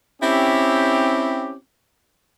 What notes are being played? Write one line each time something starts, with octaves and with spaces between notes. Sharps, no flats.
C4 C#4 E4 G4